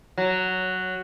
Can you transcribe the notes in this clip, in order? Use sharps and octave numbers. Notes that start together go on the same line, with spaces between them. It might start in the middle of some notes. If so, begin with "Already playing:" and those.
F#3